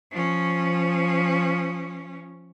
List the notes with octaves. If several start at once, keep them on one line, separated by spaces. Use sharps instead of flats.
F3 C#4